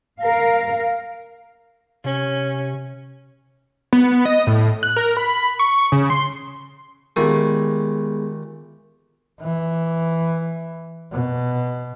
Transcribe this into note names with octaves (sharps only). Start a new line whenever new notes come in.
A#4 F5
C3 C#4
B3
D#5
A2
F#6
A#4
B5
C#6
C#3
C6
D#2 A#2 G#3 A3 B3 G#4
E3
B2